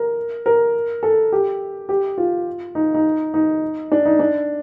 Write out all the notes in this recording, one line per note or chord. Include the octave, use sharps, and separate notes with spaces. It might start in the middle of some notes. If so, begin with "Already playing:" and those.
Already playing: A#4
A#4
A4
G4
G4
F4
D#4
D#4
D#4
D4
D#4
D4